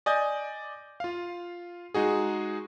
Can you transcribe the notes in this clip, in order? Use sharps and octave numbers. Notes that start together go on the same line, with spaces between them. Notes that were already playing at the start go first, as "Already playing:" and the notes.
D5 D#5 G#5 D6 D#6 G6
F4 F5
G#3 D#4 F#4 G#4